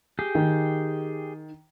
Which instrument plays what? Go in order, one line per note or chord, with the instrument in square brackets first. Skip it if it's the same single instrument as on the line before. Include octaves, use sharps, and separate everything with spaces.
[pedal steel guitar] G4 G#4 G5
[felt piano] D#3